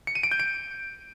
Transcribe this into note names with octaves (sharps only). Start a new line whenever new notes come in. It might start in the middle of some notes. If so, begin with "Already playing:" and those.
C#7
D#7
D7
G6
D7